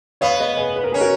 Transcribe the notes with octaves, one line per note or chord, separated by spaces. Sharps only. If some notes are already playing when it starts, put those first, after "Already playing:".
B3 C#5 F5
B4 D#5
G#4 B4
B4
A#4
C#4 G#4
F#4 A#4